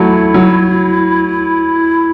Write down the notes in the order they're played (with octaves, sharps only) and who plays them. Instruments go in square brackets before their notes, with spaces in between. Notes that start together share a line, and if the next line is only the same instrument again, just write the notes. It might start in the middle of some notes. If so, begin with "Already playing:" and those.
Already playing: [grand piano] F#3 A3 [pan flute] E4
[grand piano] F#3